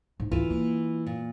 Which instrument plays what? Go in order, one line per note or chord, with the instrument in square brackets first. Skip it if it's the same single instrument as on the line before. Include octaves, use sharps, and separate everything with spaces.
[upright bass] G#2
[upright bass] D2 [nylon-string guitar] E3 F4
[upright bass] A#3
[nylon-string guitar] A#2